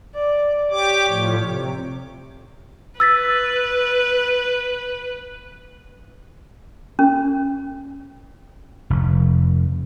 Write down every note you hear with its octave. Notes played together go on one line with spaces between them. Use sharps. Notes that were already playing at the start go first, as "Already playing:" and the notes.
D5
G4 C#5 D6
A2 F3
C3
B4 E6 A6 B6
C#4
F1